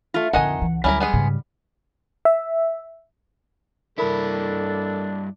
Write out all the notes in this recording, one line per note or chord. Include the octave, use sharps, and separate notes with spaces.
A3 F4
F2 D3 D#3 D#5 F#5 G#5
C#2 E3
D2 F#3 G3 C#4 E4 A#4
G#3 B3 G#4
G#2 C#3
E5
G2 D4 E4 A4 A#4 B5